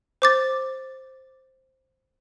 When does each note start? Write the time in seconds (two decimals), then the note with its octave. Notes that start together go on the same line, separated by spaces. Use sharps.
0.22 C5 D6 A6